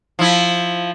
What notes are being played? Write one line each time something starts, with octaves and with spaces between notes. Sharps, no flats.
F3 E4